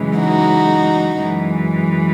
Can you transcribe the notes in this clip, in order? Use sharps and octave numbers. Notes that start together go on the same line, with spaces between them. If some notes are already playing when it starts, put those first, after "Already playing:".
Already playing: F#2 C#3 E3 G#3
D#4 F#4
F#2 E3 G#3